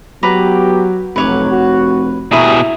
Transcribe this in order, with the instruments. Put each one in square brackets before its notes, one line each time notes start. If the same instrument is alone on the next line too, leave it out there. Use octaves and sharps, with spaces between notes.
[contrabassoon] F#3 [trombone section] B3 G4 [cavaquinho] B4 A#5 D6
[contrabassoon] F1 [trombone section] B1 F#3 [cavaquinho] B4 C#5 D6
[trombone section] F#4
[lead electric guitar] B2 G#4 [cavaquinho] E4 A#5 [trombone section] G4